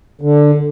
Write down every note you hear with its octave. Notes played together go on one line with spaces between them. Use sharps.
D3